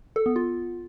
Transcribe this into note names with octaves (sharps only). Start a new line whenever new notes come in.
A4
B3
F4